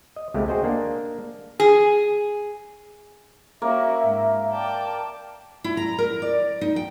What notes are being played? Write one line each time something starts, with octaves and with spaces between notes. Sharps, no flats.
D#5
C#2 G#3 A3 C4 G4
F#4 G#4 C5 D#5 G5
A#3 D4
G#4
A#3 C#4 F#4 E5
G#2
D5 G5 A5
E4
A#5
A#4
D5
D#4
G5